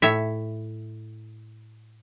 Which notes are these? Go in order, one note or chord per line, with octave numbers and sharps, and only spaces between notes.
A2 C#5 E5